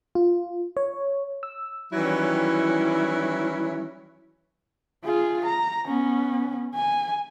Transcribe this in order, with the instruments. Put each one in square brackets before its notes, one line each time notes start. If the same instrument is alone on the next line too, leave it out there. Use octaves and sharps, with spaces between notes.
[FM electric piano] F4
C#5
E6
[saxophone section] D#3 E3 F#3 G3 C#4 E4
[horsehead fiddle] F4 G#4
A#5
B3 C#4
G#5